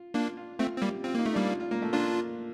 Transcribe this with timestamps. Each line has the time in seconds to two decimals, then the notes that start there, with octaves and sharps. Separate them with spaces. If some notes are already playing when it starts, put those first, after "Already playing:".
Already playing: F4
0.14 A#3 D4 F4
0.37 F4
0.59 A3 C4 F4
0.77 C4
0.82 G3 A#3 G4
1.04 C4 F4
1.15 A#3 D#4
1.26 A3
1.34 G3 A#3 D4
1.49 F4
1.60 F4
1.71 A#3
1.82 A3
1.93 A#3 D4 F4